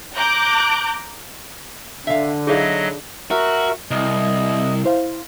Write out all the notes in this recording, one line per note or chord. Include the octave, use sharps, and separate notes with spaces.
A#5 D6 F#6 G6
D3 E5 F5
F#3 D#4 E4 G#4 A4 D5 D#5 F5
F#4 A#4 E5
C2 D#5
E4 C5 F5